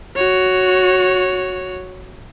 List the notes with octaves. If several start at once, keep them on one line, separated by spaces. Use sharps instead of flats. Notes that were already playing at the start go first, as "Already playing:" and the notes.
F#4 C#5